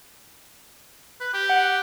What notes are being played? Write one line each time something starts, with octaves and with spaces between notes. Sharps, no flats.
B4
G4
F#5